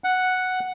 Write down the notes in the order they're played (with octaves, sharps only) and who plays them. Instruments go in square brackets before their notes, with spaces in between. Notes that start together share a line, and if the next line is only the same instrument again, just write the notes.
[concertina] F#5